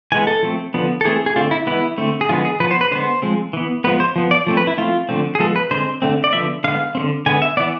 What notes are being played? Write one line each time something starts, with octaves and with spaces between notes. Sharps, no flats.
E3 G#3 B3 G#5
A4
F3 A3 C4
D3 F3 B3
A4
E3 A3 C4 G#4
G#4
D3 A3 C4 F4
E4
E3 G#3 B3 E4
D3 A3 C4
G#4
D3 F3 G#3 B3 F4
G#4
F3 B3 B4
C5
B4
D3 G#3 B3 C5
F3 G#3 C4
E3 B3
F3 G#3 B3 B4
C5
F3 B3
D5
F3 A3 C4
B4
E4
F3 A3 C4 F4
D3 F3 A3 C4
G#4
F3 G#3 B3 A4
B4
D3 G#3 C4 C5
D3 A3 C4
D5
D3 F3 B3 E5
D3 G#3 B3 F5
D3 A3 C4
D3 G#3 B3 G#5
E5
E3 B3 D5